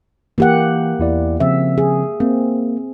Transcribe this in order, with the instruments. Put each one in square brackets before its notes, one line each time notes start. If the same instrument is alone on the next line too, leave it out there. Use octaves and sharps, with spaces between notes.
[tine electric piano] E3 [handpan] A#3 G4 F#5
[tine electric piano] E2 E4 D5
[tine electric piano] C#3 F3 C4 [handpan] E5
[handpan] G#4
[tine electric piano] A#3 [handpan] C4